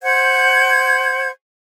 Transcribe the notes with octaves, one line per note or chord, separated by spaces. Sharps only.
C5 F#5 G6 G#6